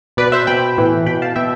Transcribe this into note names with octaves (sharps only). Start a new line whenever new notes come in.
B2 B4 D5
C5 E5
B2 G5 B5
A2 E3
B2 G5 B5
F5 A5
B2 E5 G5